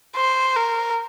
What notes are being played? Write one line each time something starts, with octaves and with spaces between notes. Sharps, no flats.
C5
A#4